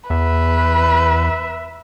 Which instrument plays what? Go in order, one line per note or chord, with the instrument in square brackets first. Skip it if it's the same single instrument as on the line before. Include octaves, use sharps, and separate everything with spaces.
[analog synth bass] E2 [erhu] B4 [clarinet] E5